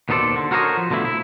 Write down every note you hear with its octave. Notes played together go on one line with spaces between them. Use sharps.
D#2 B2 D#4 A4 C5 D5
D3
F#4 A4 A#4 C5 C#5 D#5
F3
B2 D3 F3 A3 E4
E4